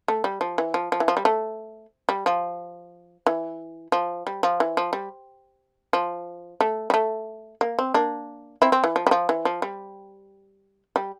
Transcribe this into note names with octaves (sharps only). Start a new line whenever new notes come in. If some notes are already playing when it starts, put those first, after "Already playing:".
A3
G3
F3
E3
F3
F3
E3
F3
G3
A3
G3
F3
E3
F3
G3
F3
E3
F3
G3
F3
A3
G3
A3
A#3
C4
A#3 D4
C4 E4
C4
E3
F3
G3
F3
E3
F3
G3
G3